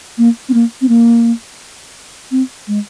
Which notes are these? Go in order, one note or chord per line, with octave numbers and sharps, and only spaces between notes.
A#3
C4
A#3
C4
A#3
C4
G#3